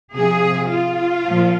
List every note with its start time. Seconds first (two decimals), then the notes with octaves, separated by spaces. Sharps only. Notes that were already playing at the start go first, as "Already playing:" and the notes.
0.15 C3 F3 G#4
0.71 F4
1.25 A#2 F3